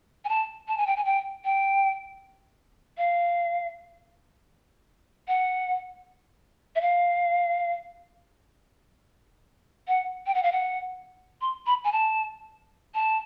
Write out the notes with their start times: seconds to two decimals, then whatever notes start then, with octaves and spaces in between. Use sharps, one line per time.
0.25 G#5
0.29 A5
0.68 A5
0.78 G#5
0.87 G5
0.97 G#5
1.06 G5
1.45 G5
2.98 F5
5.28 F#5
6.76 E5
6.81 F5
9.88 F#5
10.27 G5
10.35 F#5
10.43 F5
10.52 F#5
11.41 C6
11.67 B5
11.84 G#5
11.92 A5
12.95 A5